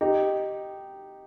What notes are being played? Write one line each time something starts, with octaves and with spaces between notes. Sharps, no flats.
D#4 G4